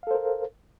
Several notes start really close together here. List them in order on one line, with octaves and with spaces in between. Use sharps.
F5 A4 C5 A#4